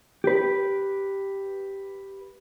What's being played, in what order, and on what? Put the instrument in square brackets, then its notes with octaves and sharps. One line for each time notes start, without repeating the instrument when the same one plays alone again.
[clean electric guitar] G4 B4